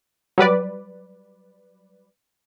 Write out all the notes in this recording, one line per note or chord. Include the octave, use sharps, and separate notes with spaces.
F#3 G3 B4 D5